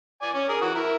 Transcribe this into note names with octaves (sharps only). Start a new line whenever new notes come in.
D5 G#5
C#4
G#4 A#4
E3 F#4
E4 A#4